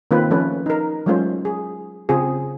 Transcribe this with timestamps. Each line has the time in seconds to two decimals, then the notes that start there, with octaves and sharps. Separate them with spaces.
0.11 D#3 A#3 C4 F4 B4
0.31 F3 A3 C#4 A4 B4
0.66 D#4 A#4
1.06 F#3 G#3 A3 C#4 F4 C5
1.45 G#4
2.09 C#3 C4 F4 G#4